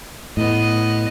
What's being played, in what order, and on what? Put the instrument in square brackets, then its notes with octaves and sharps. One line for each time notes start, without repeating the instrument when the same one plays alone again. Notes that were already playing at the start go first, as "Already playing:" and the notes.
[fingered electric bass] A2 [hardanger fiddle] B3 D#5